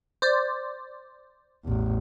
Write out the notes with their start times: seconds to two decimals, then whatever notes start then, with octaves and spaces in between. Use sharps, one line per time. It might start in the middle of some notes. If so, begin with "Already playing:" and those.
0.22 C5 D5
1.65 A1 E2